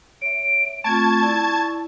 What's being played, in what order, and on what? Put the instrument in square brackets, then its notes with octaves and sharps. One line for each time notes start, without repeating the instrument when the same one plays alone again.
[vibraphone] C#5 E5 [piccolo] D7
[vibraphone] A3 C4 F4 [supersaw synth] A5 G#6 [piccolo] C#6
[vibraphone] E4 D5